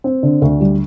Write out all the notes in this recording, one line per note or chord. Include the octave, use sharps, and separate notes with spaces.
C4
D3
D2
G3